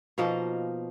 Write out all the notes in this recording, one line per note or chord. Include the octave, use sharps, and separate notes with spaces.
B2 F3 A#3 D#4